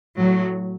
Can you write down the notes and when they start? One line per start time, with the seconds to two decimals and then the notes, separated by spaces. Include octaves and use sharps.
0.17 A2 F#3